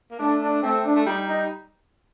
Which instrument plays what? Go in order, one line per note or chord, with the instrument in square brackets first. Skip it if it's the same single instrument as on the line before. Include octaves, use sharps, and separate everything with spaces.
[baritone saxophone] A#3
[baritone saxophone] A3 [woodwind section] D4
[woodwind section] D4
[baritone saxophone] A3 [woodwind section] C4
[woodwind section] D4
[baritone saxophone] A3
[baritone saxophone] G3 [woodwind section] D#4
[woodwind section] D#4